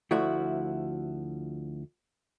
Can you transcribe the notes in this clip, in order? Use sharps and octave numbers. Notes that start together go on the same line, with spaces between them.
D2 F3 A3 E4 F#4